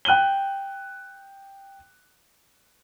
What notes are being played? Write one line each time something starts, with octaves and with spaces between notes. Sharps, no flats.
G5 F#6 D#7 F#7 G7